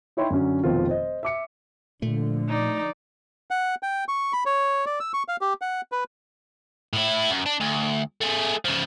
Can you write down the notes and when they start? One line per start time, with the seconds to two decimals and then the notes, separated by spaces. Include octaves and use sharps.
0.17 D#4 E4 C#5 G5 C6
0.30 F#2 D3 C#4 F#4
0.63 F1 B2 D#3 C4 F4
0.88 C5 D#5
1.23 E5 D6 C#7
2.02 A#2 D3 F3 A3
2.48 D#4 D5
3.51 F#5
3.83 G5
4.08 C#6
4.33 B5
4.46 C#5
4.86 D5
5.00 E6
5.14 C#6
5.28 F5
5.41 G4
5.61 F#5
5.92 B4
6.93 A2 E4
7.30 F#2
7.46 D4
7.61 D2
8.21 A3 G#4
8.65 C#3 F3